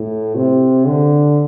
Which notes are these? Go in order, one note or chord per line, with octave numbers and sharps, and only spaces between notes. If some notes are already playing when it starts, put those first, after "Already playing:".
Already playing: A2
C3
D3